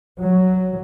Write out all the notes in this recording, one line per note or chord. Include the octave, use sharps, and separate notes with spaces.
F#3